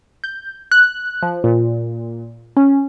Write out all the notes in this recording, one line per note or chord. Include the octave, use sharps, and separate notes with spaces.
G6
F#6
F3
A#2
C#4